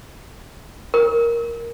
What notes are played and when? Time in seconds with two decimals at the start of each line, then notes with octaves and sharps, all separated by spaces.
0.94 A#4